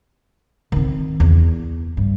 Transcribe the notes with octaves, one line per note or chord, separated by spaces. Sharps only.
D#3 C4
E2
G2